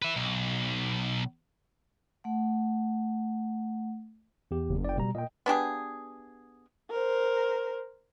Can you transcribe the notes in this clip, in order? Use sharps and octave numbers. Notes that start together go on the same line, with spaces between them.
B4 E5
B1
A3 F#5
E2 G4
F#1
D5 G5
B2 G3 A#5
A#2 D#5 G5
B3 D4 G4 G#4
A#4 C5